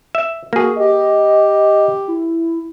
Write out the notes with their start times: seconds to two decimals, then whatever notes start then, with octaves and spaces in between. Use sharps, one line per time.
0.15 E5
0.53 A#3 F#4 G#4
0.76 G4 D#5
2.08 E4